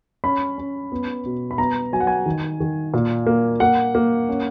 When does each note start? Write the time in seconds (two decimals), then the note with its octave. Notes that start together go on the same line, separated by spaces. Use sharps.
0.24 C#4 B5
0.58 C#4
0.92 B3
1.25 B2
1.51 B5
1.58 B3 A#5
1.92 F#3 G#5
2.00 F#5
2.07 G#5
2.26 D#3
2.60 D#3
2.94 A#2
3.27 A#3
3.60 A#3 F#5
3.95 A#3
4.29 C#4